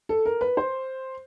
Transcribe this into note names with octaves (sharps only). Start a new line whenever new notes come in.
A4
A#4
B4
C5